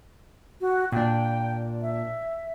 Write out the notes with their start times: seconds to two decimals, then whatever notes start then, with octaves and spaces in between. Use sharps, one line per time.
0.61 F#4
0.92 A#2 D4 G5
1.82 E5